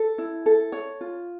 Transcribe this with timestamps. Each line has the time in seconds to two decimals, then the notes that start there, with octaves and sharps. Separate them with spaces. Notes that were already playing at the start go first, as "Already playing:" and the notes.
Already playing: A4
0.18 E4
0.46 A4
0.72 C#5
1.01 F4